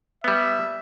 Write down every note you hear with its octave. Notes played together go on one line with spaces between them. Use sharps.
G3 B3 E5